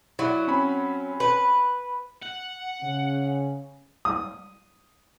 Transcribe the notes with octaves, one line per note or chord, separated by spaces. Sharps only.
F#3 E4 D5 F#5
C4 C#4 B5
B4
F#5
C#3 C#4
D#6